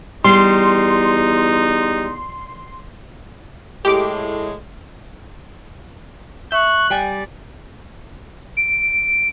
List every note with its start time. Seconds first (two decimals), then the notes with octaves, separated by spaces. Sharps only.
0.24 E2 G3 D#4 C6
3.85 A2 G#3 G4 D6
6.52 E5 C#6 F#6
6.90 G3 D5 G5 G#5
8.57 D7